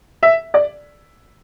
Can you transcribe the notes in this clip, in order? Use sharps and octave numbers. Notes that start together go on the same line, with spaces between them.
E5
D5